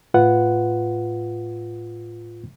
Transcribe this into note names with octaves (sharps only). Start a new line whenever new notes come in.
A2 F4 B4 F#5